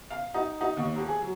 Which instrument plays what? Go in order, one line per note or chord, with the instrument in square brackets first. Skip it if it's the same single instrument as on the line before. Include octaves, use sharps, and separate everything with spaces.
[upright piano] F5
D#4
D#4
D#2
D#1
G#4
F#3